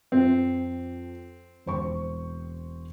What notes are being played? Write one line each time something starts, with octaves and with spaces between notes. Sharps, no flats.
F2 C4
E1 C5 C#6